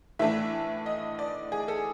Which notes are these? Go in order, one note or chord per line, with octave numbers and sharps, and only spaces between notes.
A2 E3 A3 D4 E5
D#5
D5
G#4
A4